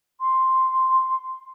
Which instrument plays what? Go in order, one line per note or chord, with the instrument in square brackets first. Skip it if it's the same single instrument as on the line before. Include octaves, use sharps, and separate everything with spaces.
[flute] C6